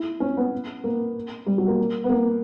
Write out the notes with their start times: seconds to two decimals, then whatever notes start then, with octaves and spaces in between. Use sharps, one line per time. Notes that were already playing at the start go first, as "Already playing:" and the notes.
Already playing: E4
0.20 C#4
0.37 B3
0.84 A#3
1.46 G3
1.58 F#3
1.68 A#3
2.04 B3
2.10 A#3